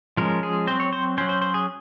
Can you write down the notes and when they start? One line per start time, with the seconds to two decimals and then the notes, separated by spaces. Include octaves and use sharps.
0.17 F3 G#3 C#4 A#4
0.43 G#4
0.67 F#3 C4 C5
0.80 C#5
0.93 C5
1.18 C#4 C5
1.21 F#3
1.29 C5
1.42 C5
1.54 G#4